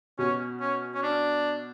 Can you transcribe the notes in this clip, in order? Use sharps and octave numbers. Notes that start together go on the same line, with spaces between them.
B2 C#4
C#4
C#4
D4